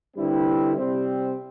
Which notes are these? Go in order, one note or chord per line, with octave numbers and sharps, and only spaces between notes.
G2 D3 G3 C4 E4
C3 G3 C4